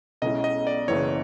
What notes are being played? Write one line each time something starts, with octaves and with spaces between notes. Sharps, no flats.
B1 B2 G#3 C#4 E4 D#5
D#5
D5
F#1 F#2 C#3 E3 C#5